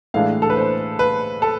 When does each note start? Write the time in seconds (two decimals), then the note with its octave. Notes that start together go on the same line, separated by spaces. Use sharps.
0.14 A2 E3 G#3 D4 F5
0.42 A4
0.50 B4
0.57 C5
0.99 B4
1.42 A4